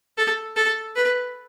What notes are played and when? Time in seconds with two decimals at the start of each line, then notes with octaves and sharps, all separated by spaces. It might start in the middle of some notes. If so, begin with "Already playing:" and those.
0.18 A4
0.56 A4
0.96 B4